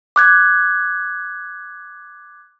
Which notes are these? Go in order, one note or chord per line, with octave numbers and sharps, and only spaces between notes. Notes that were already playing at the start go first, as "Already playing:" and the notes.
D6 F#6 G#6